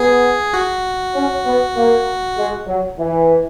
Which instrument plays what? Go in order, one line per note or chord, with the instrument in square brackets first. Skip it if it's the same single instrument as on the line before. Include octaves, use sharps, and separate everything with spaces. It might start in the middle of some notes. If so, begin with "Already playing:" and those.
Already playing: [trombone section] B3 [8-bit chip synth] G#4
[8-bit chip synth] F#4
[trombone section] C#4
B3
A#3
G#3
F#3
E3